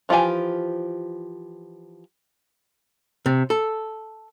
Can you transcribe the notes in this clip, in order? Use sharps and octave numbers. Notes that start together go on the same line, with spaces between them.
E3 F3 F4 G4 G#5
C3
A4